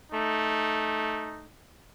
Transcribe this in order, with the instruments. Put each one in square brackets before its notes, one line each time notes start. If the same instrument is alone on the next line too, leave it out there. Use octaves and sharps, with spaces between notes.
[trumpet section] A3 D#4